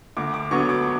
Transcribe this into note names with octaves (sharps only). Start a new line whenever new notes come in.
D2 D6
D6
D3 F#3 B3 C#6
D6